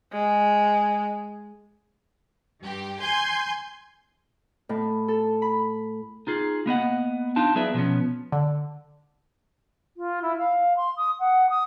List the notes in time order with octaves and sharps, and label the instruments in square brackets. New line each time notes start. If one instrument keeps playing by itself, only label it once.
[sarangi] G#3
[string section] G2 G4
G#5 C6 G6
[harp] A2
A4
B5
[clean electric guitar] D#4 F4 G#4
A#3 B3 D#5 F#5
D4 D#4 F4 A5
F#3 B3 G#4 B4 D5 E5
B2 F3 B3 C#4
[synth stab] D3
[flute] F4
E4
F5
C6
D#6
F#5
D#6